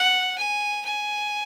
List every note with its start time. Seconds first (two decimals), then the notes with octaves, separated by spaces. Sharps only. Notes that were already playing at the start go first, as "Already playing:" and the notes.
Already playing: F#5
0.38 G#5
0.85 G#5